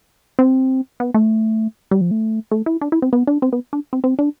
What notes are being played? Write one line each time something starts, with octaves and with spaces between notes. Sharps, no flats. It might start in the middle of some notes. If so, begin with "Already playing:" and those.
C4
B3
A3
G3
F3
A3
A3
E4
D4
E4
C4
B3
D4
C4
B3
D4
C4
C4
D4